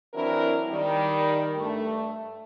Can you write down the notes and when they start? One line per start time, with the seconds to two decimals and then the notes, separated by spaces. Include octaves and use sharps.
0.14 E3 F#3 C4 D4 E4 A#4
0.70 D#3 G3
1.57 G2 A3